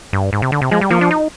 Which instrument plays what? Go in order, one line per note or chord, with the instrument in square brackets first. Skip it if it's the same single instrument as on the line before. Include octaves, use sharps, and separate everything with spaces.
[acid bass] G2
G#2
C3
D3
C3
[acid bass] F3 [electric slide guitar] G#3
[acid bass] G3
[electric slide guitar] F3 [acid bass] A#3
[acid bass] D4
D#4